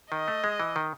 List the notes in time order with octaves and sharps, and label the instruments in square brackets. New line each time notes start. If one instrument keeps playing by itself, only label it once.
[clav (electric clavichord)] D#3 [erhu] D#5
[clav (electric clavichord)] A3
G#3
E3
D#3